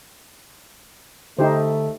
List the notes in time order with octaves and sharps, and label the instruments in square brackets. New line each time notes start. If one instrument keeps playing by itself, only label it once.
[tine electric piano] D3 [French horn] A3 [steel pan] D#4 G4 C5